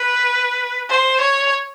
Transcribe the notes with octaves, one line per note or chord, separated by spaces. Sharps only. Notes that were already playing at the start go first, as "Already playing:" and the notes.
Already playing: B4
C5
C#5